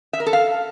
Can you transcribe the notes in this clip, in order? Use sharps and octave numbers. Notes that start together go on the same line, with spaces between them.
E5
A#4
A4
F5